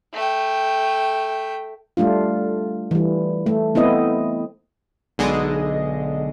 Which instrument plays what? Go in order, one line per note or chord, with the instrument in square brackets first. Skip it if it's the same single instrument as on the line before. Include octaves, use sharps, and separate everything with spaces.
[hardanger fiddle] A3 G5
[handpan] G3 A3 D4 F4
E3 G3
A3
B3 C4 E4 D#5
[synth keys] B1 D3 G#3 D#5